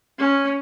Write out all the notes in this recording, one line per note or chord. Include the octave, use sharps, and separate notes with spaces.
C#4